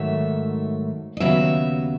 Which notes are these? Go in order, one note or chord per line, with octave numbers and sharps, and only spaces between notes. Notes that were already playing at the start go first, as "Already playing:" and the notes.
Already playing: G#2 D#3 F#3 A3 E5
D#5
D#2 C#3 F#3 B3 E5